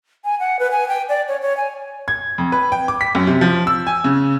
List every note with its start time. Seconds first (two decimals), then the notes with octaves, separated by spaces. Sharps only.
0.25 G#5
0.40 F#5
0.59 B4
0.71 G#5
0.89 G5
1.09 D5
1.28 C#5
1.42 C#5
1.57 G#5
2.08 G#6
2.38 F2
2.52 B4
2.72 G5
2.88 D6
3.01 B6
3.15 F#2
3.27 C3
3.41 F3
3.67 E6
3.87 G#5
4.04 C#3